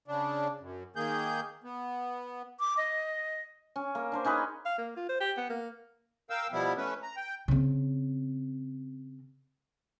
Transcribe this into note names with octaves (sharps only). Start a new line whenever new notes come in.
C#3 D4
F#2
D#3 A#3 G#4 G6
B3
D6
D#5
C#4
A#3
D4 A#4 C5
C#4 D#4 G#4 B4
F5
A#3
F4
C5
G4
B3
A#3
A#4 F5 G5 E6
B2 F3 G3 B3 E4
A3 C#4 B4
A#5
G5
C#3 C4